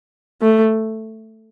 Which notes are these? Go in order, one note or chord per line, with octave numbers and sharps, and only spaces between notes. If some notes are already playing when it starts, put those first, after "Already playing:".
A3